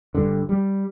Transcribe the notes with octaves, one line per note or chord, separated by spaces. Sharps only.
G1 G2 D3
G3